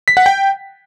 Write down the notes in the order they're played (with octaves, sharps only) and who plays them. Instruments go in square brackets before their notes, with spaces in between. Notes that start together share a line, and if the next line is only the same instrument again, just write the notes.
[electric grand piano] B6
F#5
G5